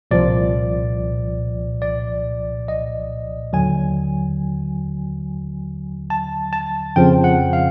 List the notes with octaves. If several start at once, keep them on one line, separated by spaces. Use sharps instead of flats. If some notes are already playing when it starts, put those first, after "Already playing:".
C2 A#2 F3 D5
D5
D#5
D#2 D3 F#3 G#5
A5
A5
F2 C#3 F3 G5
F#5
F5